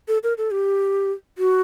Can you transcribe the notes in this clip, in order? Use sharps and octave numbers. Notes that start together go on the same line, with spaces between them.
A4
A#4
A4
G4
F#4